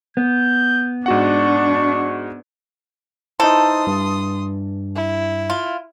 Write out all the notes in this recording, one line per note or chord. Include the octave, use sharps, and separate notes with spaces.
B3 G6
G#2 D4 F#4 F#5 C#6
E3 D#4 A4 C5 C6 D#6
G2
E4
F4